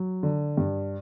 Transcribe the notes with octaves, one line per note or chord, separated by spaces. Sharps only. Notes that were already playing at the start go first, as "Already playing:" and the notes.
Already playing: F#3
D3
G2